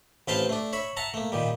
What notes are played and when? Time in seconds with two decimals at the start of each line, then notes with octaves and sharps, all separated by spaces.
0.28 A1 C4 B4 F5 G5 A5
0.49 A3 D4
0.73 C#5 E5 B5
0.97 E5 F#5 A5 A#5
1.14 A3 A#3
1.32 A#2 D#3 G3